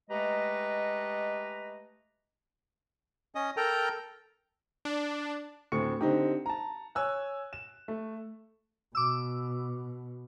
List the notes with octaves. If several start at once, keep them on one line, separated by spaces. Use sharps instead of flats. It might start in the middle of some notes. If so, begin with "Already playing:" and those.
G#3 A3 G4 B4 D#5 A#5
C#4 D#5
A4 A#4 G5 A#5
D4
D2 A2 C4 C#6 C#7
D3 C4 D#4 G4
A5 A#5
C#5 G#5 E6 F#6
E7
A3
B2 D6 E6